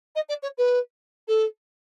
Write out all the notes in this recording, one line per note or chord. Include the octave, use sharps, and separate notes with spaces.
D#5
D5
C#5
B4
A4